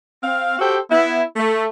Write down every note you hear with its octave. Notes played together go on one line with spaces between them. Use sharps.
C4 F5
F#4 G4 A4 C5 G5
B3 E4
A3